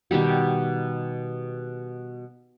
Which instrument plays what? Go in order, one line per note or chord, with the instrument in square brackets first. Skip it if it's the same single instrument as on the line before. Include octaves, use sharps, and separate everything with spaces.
[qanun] B2 D#3 G3 G4